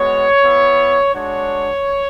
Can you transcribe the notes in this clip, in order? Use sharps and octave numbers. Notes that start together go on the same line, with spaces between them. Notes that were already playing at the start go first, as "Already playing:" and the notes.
Already playing: G#3 B3 F#4 C#5
B3 E4
G#3 D4 F#4 C#5